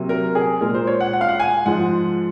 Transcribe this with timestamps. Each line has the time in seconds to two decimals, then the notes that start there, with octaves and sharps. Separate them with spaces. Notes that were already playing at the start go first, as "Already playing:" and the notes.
Already playing: C3 F#3 A#3
0.09 A#4
0.35 G#4
0.61 A#2 G#3 A#4
0.74 C5
0.87 C#5
1.00 F#5
1.13 F#5
1.21 F5
1.29 F#5
1.40 G#5
1.65 G#2 F3 G#3 F#5